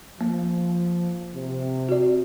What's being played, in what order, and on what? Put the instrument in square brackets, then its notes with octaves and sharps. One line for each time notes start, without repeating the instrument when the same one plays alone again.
[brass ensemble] F3 [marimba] A#3
[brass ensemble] C3
[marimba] F#4 D5